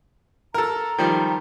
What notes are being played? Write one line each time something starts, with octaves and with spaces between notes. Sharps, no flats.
A4 A#4 A#5
D#3 F3 G3